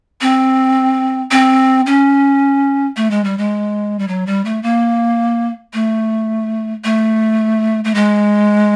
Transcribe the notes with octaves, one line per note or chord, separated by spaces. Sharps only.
C4
C4
C#4
A3
G#3
G3
G#3
G3
F#3
G3
A3
A#3
A3
A3
A3
G#3